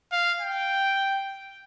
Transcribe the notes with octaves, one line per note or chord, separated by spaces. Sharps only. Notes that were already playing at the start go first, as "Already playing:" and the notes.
F5
G5